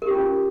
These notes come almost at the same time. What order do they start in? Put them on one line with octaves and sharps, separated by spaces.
A#4 G4 C#4 F4